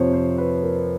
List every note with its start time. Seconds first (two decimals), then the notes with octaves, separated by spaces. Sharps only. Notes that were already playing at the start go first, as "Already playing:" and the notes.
Already playing: F2 C3 F3 C5 C#5
0.13 C5
0.38 B4
0.63 A#4